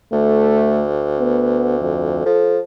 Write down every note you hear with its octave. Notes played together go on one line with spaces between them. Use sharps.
D2 A3
B3
F2
F3 A4